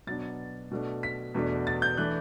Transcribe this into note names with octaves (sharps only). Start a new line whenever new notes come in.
B2 F#3 B3 D4 A6
B2 A3 D4
B6
E2 B2 A3 D4
A6
G6
E3 A3 D4 F#6